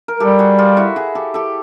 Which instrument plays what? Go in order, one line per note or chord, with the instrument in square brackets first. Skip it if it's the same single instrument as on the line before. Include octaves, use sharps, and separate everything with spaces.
[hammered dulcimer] A#4
[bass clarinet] G3 [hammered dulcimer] G4 A4
[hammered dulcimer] F#4 G#4
F4 G4
E4 F#4
F#4 G#4
G4 A4
G4 A4